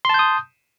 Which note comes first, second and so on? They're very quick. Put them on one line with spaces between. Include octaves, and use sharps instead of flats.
C6 A5 G6 D#6